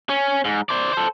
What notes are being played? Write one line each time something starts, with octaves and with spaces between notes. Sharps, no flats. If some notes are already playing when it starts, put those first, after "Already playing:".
C#4
G#2
C5 D5
A4 C5